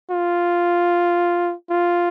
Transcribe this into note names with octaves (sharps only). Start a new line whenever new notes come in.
F4
F4